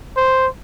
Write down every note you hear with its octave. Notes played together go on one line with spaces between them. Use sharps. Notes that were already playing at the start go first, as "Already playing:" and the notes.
C5